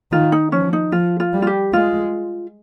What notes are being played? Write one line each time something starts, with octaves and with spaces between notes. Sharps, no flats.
D#3 F4
D#4
F3 C#4
D#4
F3 F4
F4
G3
F4
G4
G#3 F4